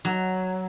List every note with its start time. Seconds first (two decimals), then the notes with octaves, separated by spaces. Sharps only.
0.05 F#3